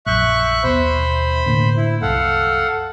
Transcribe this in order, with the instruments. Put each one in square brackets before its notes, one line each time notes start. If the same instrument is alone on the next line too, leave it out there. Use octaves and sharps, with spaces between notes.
[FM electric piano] A#1 F#2 G6 [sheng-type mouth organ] E5 C#6 F#6
[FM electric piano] D#2 B2 E5 [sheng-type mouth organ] C5 B5
[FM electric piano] A2 D3 A#3
[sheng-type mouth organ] E4
[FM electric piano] C2 F#2 [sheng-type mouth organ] A4 F5 F#5